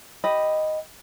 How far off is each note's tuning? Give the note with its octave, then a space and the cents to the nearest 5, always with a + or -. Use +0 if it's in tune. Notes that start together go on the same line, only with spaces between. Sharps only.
G4 +0 D#5 +0 B5 +0